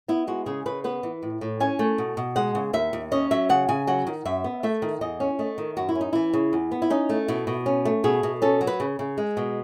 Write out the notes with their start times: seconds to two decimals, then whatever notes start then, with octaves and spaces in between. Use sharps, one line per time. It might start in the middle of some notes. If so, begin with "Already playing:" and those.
0.08 B3 E4
0.27 G#3 F#4
0.46 C#3 G#4
0.66 C#3 B4
0.84 B3 B4
1.03 E3
1.22 A2
1.41 A2
1.60 C#4 G#5
1.79 A3
1.98 B2
2.17 B2
2.36 G#3 F#5
2.55 C#3
2.73 D#2 E5
2.93 D#2
3.12 C#4 D#5
3.31 F#3 E5
3.49 C#3 F#5
3.69 C#3 G#5
3.87 F#3 F#5
4.07 D#3
4.25 F#2 E5
4.44 B3
4.63 A3 E5
4.82 D#3
5.01 E2 D#5
5.20 C#4
5.39 A3 D#5
5.58 D#3
5.77 F#2 F#4
5.89 E4
5.95 C#4
6.01 D#4
6.13 E3 E4
6.33 C#3
6.53 E2
6.71 B3
6.82 E4
6.90 C#4 D#4
7.09 A3
7.28 B2 E4
7.47 B2
7.66 C#4
7.85 A3
8.04 B2 G#4
8.23 B2
8.42 C#4 A4
8.61 F#3
8.67 B4
8.80 C#3
8.99 C#3
9.18 G#3
9.37 B2